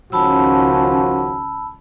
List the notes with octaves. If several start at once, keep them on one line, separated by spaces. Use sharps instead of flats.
C#2 D#3 F3 C#4 F#4 A5 B5 E6